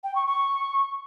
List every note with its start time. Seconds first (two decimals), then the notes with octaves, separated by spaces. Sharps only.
0.04 G5
0.15 C#6
0.27 C#6